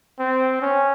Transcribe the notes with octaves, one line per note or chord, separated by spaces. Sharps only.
C4
C#4